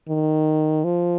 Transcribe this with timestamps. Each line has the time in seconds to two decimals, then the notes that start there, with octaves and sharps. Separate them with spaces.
0.09 D#3
0.84 F3